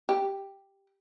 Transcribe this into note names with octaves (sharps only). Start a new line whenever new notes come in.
G4